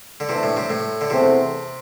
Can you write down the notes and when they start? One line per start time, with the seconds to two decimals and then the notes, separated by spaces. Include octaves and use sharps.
0.20 D3
0.29 C3 E3 A3 D4
0.43 A2
0.57 C3
0.70 A2
1.01 D3
1.10 E2 C3 E3 A3 C4 A4